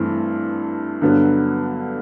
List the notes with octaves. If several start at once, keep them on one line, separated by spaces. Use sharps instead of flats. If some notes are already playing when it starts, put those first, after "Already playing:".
Already playing: G2 E3 A3 C4
G2 D3 F#3 B3